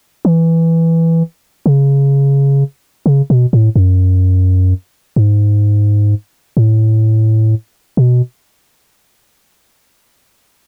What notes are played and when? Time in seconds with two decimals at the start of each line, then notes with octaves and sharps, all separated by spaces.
0.25 E3
1.66 C#3
3.06 C#3
3.30 B2
3.53 A2
3.76 F#2
5.16 G#2
6.57 A2
7.97 B2